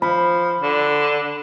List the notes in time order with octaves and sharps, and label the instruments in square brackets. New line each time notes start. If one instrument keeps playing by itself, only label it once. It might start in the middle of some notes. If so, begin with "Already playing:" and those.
[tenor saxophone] F3 [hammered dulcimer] B5
[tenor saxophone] D3